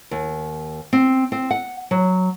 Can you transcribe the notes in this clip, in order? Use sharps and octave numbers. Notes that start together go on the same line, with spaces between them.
D#2
C4
C4
F#5
F#3